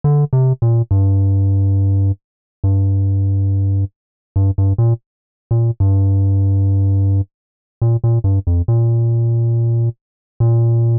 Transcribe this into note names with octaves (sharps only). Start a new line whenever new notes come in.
D3
C3
A#2
G2
G2
G2
G2
A#2
A#2
G2
A#2
A#2
G2
F2
A#2
A#2